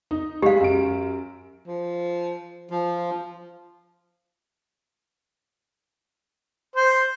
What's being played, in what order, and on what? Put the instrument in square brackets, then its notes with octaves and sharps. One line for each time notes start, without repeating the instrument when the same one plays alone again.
[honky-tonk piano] D#4
[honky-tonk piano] G#3 [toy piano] G4 F5
[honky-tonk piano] F#2 D7
[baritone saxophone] F3
[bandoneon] F3 [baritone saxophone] F4
[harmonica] C5